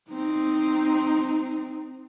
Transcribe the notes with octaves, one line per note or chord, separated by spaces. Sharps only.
C4 D#4